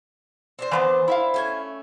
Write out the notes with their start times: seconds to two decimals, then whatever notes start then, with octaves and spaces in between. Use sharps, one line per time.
0.59 C4 D4 C5
0.71 E3 A#3 B3
1.08 E4 E5 F5
1.34 A3 C#4 G#5